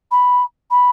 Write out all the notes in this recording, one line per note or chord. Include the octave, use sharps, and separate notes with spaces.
B5
B5